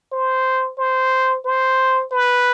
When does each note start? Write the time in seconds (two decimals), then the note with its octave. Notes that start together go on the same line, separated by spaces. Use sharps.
0.12 C5
0.78 C5
1.45 C5
2.12 B4